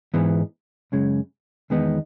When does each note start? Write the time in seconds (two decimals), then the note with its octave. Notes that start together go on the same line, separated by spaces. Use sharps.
0.14 G#2 E3 G#3 B3
0.92 F#2 C#3 G#3
1.70 E2 D#3 G#3 B3 D#4